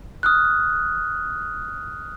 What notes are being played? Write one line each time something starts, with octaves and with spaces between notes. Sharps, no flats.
D#6 F6 F#6